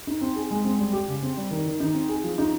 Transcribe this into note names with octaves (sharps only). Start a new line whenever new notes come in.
D#4
C4
G#4
G#3
C4
G3
G4
C#3
C4
G3
D#3
D#3
D#4
C4
G#4
F3
D#4